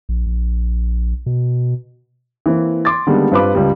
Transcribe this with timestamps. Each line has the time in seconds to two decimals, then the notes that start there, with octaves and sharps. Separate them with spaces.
0.09 A#1
0.26 A#1
1.26 B2
2.46 E3 A#3 C4
2.85 C6 D6 A6
3.07 D3 D#3 G3 G#3 A#3 B3
3.32 G2 C4 F4 B4 B5 D6
3.55 C#2 G3